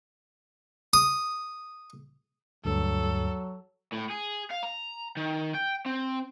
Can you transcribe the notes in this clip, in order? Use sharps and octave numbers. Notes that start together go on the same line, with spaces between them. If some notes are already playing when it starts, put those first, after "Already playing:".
D#6
D2 G2 F#3 A4
A2
G#4
F5
A#5
D#3
G5
C4